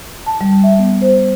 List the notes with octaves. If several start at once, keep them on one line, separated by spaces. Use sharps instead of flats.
A5
G3
E5
B3
C5